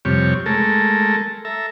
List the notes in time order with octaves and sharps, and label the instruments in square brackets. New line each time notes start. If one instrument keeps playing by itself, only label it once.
[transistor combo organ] F2 C3 G3 C#5
G#3 A3 A4 A#4
A4 E5 A#5